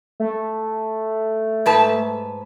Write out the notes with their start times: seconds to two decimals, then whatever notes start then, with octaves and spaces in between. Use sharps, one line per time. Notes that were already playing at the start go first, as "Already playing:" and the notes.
0.20 A3
1.66 G#2 B4 A5